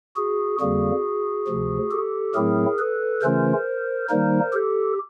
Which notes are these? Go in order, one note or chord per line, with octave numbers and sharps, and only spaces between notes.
F#4 G#4
F2 D3 G3 A#3 F#4 G#4
D2 C3 F3
G4 A4
A2 F#3 A3 C4 E4 G#4 A#4
A4 B4
C#3 E3 A3 C#4 F4 A#4 C5
D#3 G3 A#3 D#4 A#4 C5
G4 A4